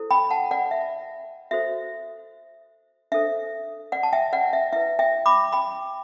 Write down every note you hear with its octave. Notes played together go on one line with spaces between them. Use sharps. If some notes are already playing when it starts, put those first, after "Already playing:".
Already playing: E4 A4 C5
G5 B5
F#5 A5
D5 F#5
E5
F#4 A4 C5 E5
D4 A4 C5 E5
D5 F#5
A5
E5 G5
D5 F#5
E5
E4 B4 E5
E5 G5
B5 D6
G5 B5